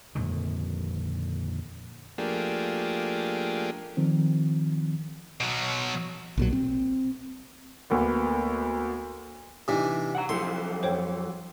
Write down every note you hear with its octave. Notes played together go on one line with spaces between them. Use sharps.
F2 A#2 D3 D#3
F3 A3 A#3 D4 G4 G#4
D#3 F3 C4
B2 F#3
B1 A#2 F#3
C4
D2 A#3 B3
C3 E3 D4 D#4
F#5 G5 A#5
F3 F#3 E4 G4 A4 C6
F2 C5 C#5 G5